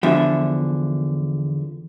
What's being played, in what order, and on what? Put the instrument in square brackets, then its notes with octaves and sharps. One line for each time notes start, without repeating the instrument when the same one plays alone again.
[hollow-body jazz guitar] E2 D3 F3 E5